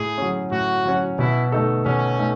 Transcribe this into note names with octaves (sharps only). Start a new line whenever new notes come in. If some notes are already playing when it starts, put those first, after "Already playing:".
Already playing: A2 G#4
F#3 C#4
A2 F#4
F#3 C#4
B2 E4
A3 D#4 A4
B2 C#4
A3 D#4 A4